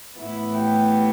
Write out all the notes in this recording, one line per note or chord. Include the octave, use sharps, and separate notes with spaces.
A2 E3 B3 E4
G4